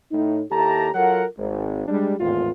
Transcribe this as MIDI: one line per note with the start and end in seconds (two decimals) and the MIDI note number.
0.11 0.42 45
0.11 0.42 63
0.51 0.88 39
0.51 0.88 64
0.51 0.88 67
0.51 0.88 69
0.51 0.88 81
0.51 0.88 82
0.95 1.23 54
0.95 1.23 65
0.95 1.23 69
0.95 1.23 70
0.95 1.23 78
1.37 1.85 32
1.88 2.14 55
1.88 2.14 56
1.88 2.14 62
2.20 2.51 32
2.20 2.51 40
2.20 2.51 45
2.20 2.51 65